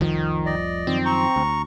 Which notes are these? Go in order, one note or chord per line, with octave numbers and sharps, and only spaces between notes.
F1 C2 D#3 F3
D5 D#5
F#2 D#3 F3 C4
A#5 C#6
D2